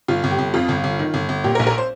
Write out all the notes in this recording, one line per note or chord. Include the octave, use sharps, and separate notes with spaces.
G1 F4
G1
G4
G1
F2 F4
G1
G1
D#3
G1
G1
A#2 G4
A#4
A#1
A#4
C5